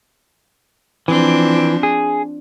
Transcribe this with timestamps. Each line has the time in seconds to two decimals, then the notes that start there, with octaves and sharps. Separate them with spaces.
1.08 E3 F3 C4 D4
1.83 G#4